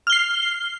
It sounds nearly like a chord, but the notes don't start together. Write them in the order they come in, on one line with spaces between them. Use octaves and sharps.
F6 G7 C7